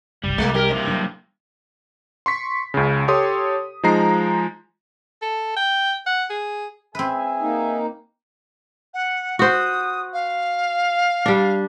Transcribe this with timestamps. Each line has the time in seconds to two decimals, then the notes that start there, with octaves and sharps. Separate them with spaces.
0.23 F#1 C2 G3
0.38 C2 G#3 A#3
0.54 G3 G4 A#4
0.71 G2 C3 A#3
0.87 F#3 D4
2.26 C6 C#6 B6
2.74 C#2 C#3
3.08 G4 A4 C#5 C6 D#6
3.83 F3 G#3 D#4 A#5 C7
5.22 A4
5.56 G5
6.06 F#5
6.30 G#4
6.95 C4 G#4 B4 E5 G#5
7.41 A#3 D#4
8.94 F#5
9.39 F#4 C5 D#6
10.13 F5
11.26 G3 D4